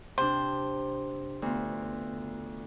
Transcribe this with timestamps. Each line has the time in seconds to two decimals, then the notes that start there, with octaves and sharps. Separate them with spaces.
0.18 C3 D4 C5
1.42 D2 B3 F4